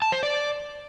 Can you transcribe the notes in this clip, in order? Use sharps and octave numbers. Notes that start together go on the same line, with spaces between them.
A5
C5
D5